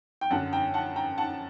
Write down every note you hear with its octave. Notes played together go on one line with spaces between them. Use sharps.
G5
F#2 D3 F#5 A5
G5 A#5
F#5 A5
G5 A#5
F#5 A5